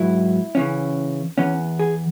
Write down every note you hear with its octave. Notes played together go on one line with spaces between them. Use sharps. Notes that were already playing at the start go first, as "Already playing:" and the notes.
Already playing: G#2 F#3 B3 E4
C#3 E3 C#4
E2 E3 B3 C#4
G#4